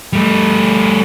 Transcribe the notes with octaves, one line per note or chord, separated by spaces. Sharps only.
G3 A3